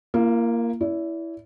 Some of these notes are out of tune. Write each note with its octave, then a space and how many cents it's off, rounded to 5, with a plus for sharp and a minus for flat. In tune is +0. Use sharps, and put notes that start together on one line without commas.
A#3 +0 F4 -45
E4 +0 D5 -40